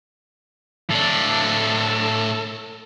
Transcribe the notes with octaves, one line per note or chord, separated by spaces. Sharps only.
A2 D4 A4